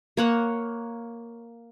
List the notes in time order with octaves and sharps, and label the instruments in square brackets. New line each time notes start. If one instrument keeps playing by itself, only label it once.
[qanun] A#3 C#5 F#5